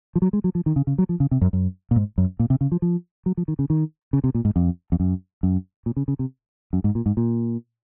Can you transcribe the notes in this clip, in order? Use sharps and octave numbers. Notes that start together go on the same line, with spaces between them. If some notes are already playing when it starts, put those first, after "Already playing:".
F3
F#3
G#3
F#3
F3
D#3
C#3
C#3
F#3
F3
C#3
C3
F#2
F#2
A#2
G#2
F#2
A#2
C3
C#3
F3
F3
F#3
F3
D#3
C#3
D#3
C#3
C3
A#2
G#2
F2
F2
F#2
F#2
A#2
C#3
C#3
C3
F#2
G#2
A#2
G#2
A#2